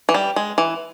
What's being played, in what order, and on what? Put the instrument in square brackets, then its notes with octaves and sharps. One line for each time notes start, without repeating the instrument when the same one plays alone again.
[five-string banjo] E3
G3
G#3
E3